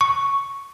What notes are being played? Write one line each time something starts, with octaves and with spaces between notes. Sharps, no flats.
C#6